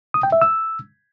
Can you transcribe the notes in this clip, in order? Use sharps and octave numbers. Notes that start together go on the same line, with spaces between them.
D#6
G5
E5
E6